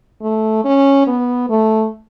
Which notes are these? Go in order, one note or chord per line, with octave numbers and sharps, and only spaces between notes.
A3
C#4
B3
A3